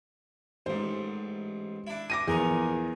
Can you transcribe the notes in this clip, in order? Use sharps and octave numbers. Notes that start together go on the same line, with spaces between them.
A1 G#2 C5
D4 E4
D6 A#6 D#7
A#1 E2 G#4 A#4 C#6